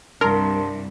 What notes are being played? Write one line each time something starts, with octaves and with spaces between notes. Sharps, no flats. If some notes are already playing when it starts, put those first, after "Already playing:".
C2 G2 D4 A#4 C6